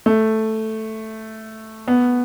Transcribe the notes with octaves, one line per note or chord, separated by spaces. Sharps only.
A3
B3